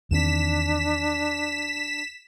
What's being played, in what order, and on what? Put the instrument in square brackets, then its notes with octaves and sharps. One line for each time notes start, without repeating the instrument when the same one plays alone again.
[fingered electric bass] E2 D#3 C4 [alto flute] D4 [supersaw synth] B6 E7